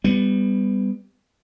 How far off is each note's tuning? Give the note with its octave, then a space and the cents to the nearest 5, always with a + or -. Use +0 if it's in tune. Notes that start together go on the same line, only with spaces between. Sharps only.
G3 +20 B3 +20